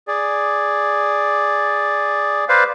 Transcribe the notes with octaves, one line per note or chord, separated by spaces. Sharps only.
G#4 D5
B4 C5 D5 F5